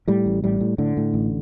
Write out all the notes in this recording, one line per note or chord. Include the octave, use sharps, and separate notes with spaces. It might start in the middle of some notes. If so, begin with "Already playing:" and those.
A2 G3
A1
A2 G3
A2
A2 D3
A2
A1